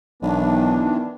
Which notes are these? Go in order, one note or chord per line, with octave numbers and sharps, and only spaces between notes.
B1 D#3 E3 B3 D4